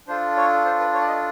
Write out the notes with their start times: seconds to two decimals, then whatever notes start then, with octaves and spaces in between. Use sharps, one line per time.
0.08 D4 F4 A4 C5
0.37 C#5
0.65 C5
0.80 B4
0.93 C#5
1.01 D5
1.08 D#5